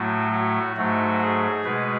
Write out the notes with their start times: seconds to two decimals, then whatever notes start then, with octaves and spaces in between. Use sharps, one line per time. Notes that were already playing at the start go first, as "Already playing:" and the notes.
Already playing: A2 F#3 A3 F#4
0.32 F#4
0.77 G#2 F#3 A3 F#4
1.21 G#4
1.65 B2 G#3 B4